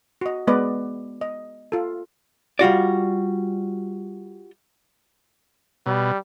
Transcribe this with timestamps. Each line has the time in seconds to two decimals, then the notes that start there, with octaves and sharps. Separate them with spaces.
0.21 F#4 D#5
0.47 G#3 B3 B4 D5 D#5
1.21 D#5
1.72 F4 A4
2.59 G3 F4 F#4 D5
5.86 B2 G3